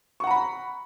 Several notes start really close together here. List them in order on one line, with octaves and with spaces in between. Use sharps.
C#6 F#5 A#5 B5